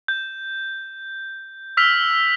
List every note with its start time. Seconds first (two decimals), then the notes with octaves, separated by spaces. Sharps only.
0.08 G6
1.77 E6 F6 B6 F7